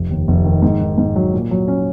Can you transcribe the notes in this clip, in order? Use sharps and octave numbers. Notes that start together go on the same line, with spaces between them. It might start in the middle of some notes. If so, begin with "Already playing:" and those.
Already playing: F1
D#2
F1
D#3
G#2
D#3
G#2
F#3
A#2
F#3
C#4